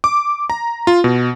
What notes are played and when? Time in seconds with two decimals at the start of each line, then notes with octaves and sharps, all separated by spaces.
0.04 D6
0.50 A#5
0.87 F4
1.04 B2